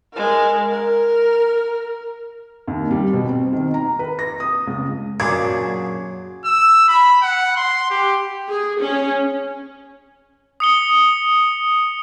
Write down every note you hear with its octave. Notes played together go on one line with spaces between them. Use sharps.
G#3 A#4
A#4
D#2
G3
B2
C4
D#3
A#5
B4
A#6
D#6
C#2
F#2 A#2 C#3 F#3 D4 G#6
E6
B5
F#5
C6
G4
G#4
C#4
D#6 C#7 G7